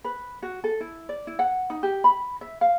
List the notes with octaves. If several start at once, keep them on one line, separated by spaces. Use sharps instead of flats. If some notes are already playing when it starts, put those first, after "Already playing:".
B4
F#4
A4
E4
D5
E4
F#5
D#4
G4
B5
E5
F5